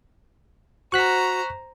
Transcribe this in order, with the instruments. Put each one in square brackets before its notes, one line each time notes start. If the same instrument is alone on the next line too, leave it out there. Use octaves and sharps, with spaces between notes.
[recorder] F#4 [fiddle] C5 A#5 [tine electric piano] C#6 F#6 B6